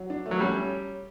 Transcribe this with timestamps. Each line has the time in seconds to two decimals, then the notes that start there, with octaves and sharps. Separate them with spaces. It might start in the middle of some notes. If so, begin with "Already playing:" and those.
Already playing: F#3
0.10 D4
0.26 A3
0.31 F#3
0.40 G3 C#4